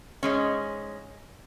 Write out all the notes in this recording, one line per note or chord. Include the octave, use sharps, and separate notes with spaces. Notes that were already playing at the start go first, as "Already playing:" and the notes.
G#2 G#3 C#4